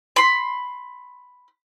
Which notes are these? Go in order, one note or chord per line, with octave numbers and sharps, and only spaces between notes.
B5 C6